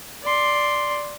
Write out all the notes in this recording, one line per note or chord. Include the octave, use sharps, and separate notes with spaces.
D5 C6